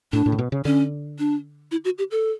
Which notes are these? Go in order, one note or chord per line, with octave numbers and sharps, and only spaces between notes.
A2 D4
A2
C#3
B2
C#3
D3 C#4
D4
E4
F#4
G4
A4